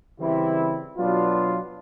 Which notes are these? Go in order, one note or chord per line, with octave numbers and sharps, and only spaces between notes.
C#3 E3 G3 C4 E4
B2 F#3 B3 D4 F4